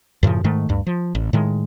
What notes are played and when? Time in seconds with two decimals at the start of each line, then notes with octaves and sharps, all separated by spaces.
0.23 F#2 A2 C#3 F3
0.44 G#2 D#3 A3
0.69 D2 G2
0.87 F3
1.15 A1
1.33 A2 D#3 G#3